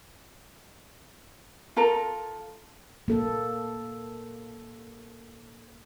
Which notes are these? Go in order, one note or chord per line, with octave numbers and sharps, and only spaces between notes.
F4 A4 A#4 A#5
A#3 A4